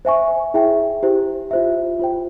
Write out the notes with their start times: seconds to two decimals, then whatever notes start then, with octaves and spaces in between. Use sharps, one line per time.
0.05 C5 E5 G#5 C#6
0.54 E4 G#4 E5 G5
1.03 E4 G4 C5
1.51 F4 C5 E5
1.99 F4 C5 G5